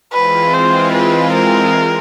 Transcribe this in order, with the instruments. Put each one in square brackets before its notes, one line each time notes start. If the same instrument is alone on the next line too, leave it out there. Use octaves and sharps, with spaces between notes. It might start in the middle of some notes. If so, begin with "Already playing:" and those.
[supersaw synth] E3 G#3 C4 F4 [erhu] B4
[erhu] C5
B4
A#4